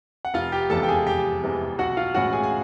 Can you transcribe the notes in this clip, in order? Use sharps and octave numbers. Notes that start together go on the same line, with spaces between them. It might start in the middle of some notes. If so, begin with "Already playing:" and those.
F#5
F1 F4 F5
G4 G5
E2 C3 E3 G#3 A4 A5
G5
G#4 G#5
F1 G4 G5
E2 C3 E3 G#3
B1 F#4 F#5
F4 F5
A2 E3 G#3 C#4 F#4 F#5
G#4 G#5
G#5